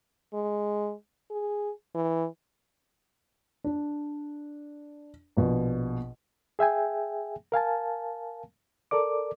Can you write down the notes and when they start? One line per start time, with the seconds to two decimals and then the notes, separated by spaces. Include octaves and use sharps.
0.34 G#3
1.31 G#4
1.95 E3
3.64 D4
5.37 A#1 B2
6.59 G#4 E5 G5 G#5
7.52 A#4 F5 G#5 A5
8.91 A4 A#4 D5 D6